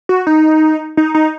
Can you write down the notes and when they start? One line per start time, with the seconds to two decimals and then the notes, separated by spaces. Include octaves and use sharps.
0.09 F#4
0.27 D#4
0.97 D#4
1.15 D#4